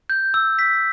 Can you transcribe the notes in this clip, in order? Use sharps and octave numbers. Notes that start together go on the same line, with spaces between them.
G6
E6
B6